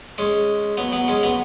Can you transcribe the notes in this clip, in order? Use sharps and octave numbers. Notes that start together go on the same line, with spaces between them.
G#3 C#4
F#3 B3
F#3 B3
G#3 C#4
F#3 B3